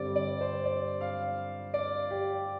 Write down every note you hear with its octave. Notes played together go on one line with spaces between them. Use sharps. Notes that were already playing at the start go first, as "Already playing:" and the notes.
Already playing: G2 D3 G3 C4 D5
D5
C5
D5
F5
D5
G4